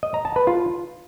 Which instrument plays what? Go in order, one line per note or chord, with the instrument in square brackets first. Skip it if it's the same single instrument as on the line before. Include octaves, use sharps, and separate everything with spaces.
[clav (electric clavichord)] D#5
A#5
A5
B4
F4